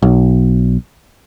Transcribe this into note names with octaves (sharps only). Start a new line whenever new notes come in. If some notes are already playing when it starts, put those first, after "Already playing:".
B1